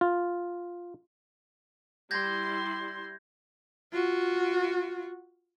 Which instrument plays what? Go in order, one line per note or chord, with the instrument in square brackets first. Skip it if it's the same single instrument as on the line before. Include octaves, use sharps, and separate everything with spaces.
[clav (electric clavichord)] F4
[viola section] G3 E4 C6 [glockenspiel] G6 G#6 A#6
[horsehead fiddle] F4 F#4